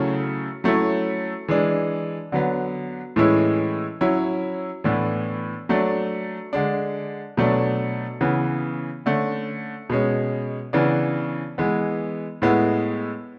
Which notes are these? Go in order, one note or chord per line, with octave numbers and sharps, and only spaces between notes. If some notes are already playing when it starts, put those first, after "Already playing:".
Already playing: C#3 F#3 A3 C#4 E4
F#3 A3 C#4 E4
E3 G#3 D4
D3 F#3 B3
A2 E3 G#3 C#4 E4
F#3 C#4 E4
A2 E3 B3 D4
F#3 A3 D4
D3 G#3 D4
B2 F#3 A3 D4
C#3 E3 B3
D3 A3 C#4
B2 G#3 C#4
C#3 E3 B3 D4
E3 G#3 B3
A2 G#3 B3 E4